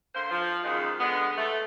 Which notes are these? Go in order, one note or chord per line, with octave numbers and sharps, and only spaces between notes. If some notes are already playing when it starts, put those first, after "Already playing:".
D3 A#3 C5
F3
F#2 D#3 G#3
D3 G#3 B3
A3